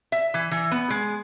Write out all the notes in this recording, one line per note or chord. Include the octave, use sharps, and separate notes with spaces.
E5
E3
E3
B3
G#3